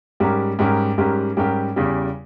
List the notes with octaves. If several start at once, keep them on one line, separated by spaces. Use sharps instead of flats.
G#2 G3 C#4 G4 A#4
G#2 G3 C#4 G4 A#4
G#2 G3 C#4 G4 A#4
G#2 G3 C#4 G4 A#4
E2 C#3 G3